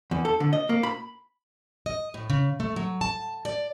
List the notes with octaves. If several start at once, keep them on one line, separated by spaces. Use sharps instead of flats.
E2
A4
D3
D#5
A#3
B5
D#5
A2
C#3
A3
F#3
A5
D5